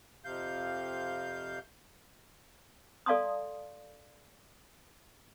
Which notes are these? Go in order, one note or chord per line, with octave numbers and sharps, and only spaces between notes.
F2 C3 F5 G6
A4 D5 F5 A5 C6 D#6